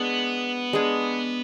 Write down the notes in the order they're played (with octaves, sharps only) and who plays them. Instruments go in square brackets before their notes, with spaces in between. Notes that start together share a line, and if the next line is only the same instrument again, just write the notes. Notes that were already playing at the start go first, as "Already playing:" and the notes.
Already playing: [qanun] G#3 D4 G#4 [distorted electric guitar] B3
[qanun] G#3 D4 G#4